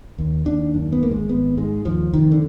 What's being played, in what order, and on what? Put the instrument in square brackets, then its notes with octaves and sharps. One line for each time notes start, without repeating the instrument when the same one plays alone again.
[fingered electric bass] D#2
D#2 D4
F#2
B3
G#1 A#3
G#3
G#1 B3
G#2 G#3
D#2 F3
F1 D#3
D3